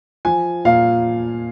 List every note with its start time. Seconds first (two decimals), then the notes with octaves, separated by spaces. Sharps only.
0.25 F3 G#5
0.65 A#2 F5